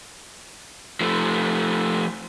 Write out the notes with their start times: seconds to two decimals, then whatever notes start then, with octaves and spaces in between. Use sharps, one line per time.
1.01 F3 A3